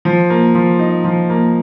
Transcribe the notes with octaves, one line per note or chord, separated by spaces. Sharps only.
F3
A#3
F3
D#4
F3
A#3